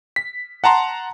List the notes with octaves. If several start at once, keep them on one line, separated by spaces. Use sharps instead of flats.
B6
F#5 A5 A#5 C6